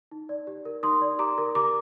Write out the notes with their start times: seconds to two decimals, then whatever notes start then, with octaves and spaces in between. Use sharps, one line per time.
0.11 D#4
0.29 D5
0.47 G4
0.65 A#4
0.83 D#4 C6 D#6
1.02 D5
1.19 G4 A#5 D6
1.38 A#4
1.55 G4 A#5 D6